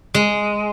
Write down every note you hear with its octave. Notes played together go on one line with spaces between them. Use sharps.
G#3